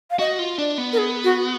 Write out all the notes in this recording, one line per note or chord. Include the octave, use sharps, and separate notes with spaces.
F5
F#4 D#5
F4
D4 D5
B3
A#4
G#4
F#4